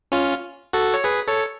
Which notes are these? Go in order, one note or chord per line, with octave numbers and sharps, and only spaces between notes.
C#4 F4
F#4 A4
C#5
G#4 B4
A4 C#5